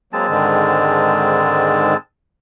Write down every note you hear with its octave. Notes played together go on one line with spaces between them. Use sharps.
F#3 G#3 A#3 C4 A5
G#2 D3 D#3